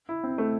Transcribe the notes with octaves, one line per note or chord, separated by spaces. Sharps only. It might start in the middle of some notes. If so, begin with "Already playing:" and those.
E4
C4
A3